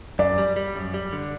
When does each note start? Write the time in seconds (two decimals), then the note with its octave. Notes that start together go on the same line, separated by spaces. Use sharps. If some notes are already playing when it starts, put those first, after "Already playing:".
0.19 F#2 D5
0.38 G3
0.56 G3
0.75 F#2
0.94 G3
1.13 D3